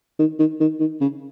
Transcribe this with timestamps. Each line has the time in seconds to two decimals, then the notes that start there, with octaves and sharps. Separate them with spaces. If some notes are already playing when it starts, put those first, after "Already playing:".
0.19 D#3
0.39 D#3
0.61 D#3
0.80 D#3
1.01 C#3